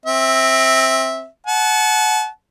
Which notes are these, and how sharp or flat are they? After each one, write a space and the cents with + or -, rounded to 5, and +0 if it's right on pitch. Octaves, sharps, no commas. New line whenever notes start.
C4 +20 E5 -10
F#5 +0 A5 -35